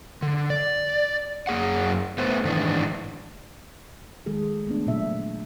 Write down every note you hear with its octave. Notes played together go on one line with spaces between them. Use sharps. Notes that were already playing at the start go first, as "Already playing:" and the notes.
D3
D5
F#2 A#3 G#4 F#5
A3 B3 A4 B4 C5
G#2 D#3 E3 D4
D#3 G#3 G#4 A4
A3 B3 D4
A#2 C#3 F#3 E5